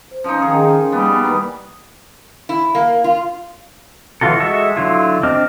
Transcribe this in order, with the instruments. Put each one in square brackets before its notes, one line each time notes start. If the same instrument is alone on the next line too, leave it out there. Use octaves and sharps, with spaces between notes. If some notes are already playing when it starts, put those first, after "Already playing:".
[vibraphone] C5
[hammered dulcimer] F3 D#4 [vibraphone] C#4
[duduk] D#3 [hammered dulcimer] G#4
[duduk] G3 [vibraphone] A#3 G#5 [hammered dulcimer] B3
[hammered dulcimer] D#3 E3
[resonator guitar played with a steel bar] E4
A#3
F4
[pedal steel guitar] E3 F#3 F4 F#4 A4
G#3 F#4 A4 E5
D3 F#3 E4 F4
C4 D4 D#5 D6 F6